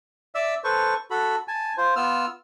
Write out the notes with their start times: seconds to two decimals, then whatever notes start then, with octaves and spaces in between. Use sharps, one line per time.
0.35 D5 E5 E6
0.64 A4 B4 C5 C#6
1.11 F#4 A4 B5
1.48 G#5 A5
1.78 F4 C5
1.96 B3 F4 E6 F6